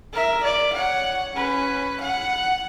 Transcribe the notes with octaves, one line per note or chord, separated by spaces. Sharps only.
A#4 E5
D5
C#5 F#5
C#4 B4
F#5